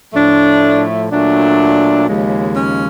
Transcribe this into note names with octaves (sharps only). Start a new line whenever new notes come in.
A2 F3 A3 D4
A#2 F#3 A3 D4
D#2 C#3 F3 G#3
C#4